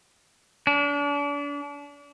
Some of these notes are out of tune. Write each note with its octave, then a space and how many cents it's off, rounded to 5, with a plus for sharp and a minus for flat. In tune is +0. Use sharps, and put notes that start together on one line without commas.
D4 -35